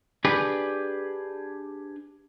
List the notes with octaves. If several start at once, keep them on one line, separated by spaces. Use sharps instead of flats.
D4 G4 G#4 B4